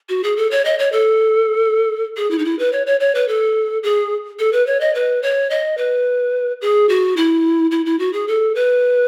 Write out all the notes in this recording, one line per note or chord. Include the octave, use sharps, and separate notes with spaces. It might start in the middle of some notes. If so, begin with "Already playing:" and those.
F#4
G#4
A4
C#5
D#5
C#5
A4
G#4
E4
D#4
E4
B4
C#5
C#5
C#5
B4
A4
G#4
A4
B4
C#5
D#5
B4
C#5
D#5
B4
G#4
F#4
E4
E4
E4
F#4
G#4
A4
B4